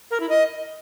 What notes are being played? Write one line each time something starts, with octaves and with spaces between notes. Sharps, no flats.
A#4
E4
D#5